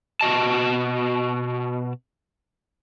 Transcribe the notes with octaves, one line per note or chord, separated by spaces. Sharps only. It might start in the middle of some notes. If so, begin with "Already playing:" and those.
B2 F#4 D#5 A5